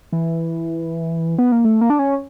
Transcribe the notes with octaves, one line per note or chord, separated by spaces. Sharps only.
E3
B3
A#3
A3
A#3
D4
C#4